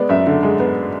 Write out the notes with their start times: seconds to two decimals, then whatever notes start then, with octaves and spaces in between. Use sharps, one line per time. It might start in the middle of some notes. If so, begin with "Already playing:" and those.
Already playing: G#3 B3 D5
0.09 F#2 E5
0.26 D3
0.43 G#3
0.60 B3